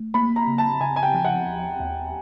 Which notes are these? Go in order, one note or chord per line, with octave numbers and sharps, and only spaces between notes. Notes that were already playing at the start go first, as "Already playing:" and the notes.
Already playing: A3
A#3 B5
A#5
C#3
A5
C#3 G#5
G#5
G5
F3
F#5
D#2
D#2